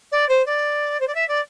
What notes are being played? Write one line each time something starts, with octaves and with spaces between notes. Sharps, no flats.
D5
C5
D5
C5
D5
E5
D5